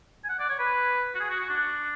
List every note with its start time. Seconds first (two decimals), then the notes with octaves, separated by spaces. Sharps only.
0.25 G#5
0.29 F#5
0.39 D5
0.49 C#5
0.59 B4
1.15 F#4
1.20 G#4
1.30 F#4
1.40 F#4
1.50 D4